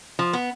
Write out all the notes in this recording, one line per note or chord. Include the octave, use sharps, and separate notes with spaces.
F3
B3